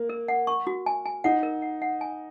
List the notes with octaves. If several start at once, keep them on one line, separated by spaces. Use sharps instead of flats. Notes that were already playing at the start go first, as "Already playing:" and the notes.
Already playing: A#3
A#4
F#5
C#6
F#4
G#5
G#5
D#4 F#5
A#4
F#5
F#5
G#5